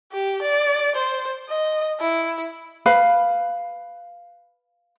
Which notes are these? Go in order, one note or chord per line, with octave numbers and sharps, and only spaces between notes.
G4
D5
C5
D#5
E4
B4 F5 B5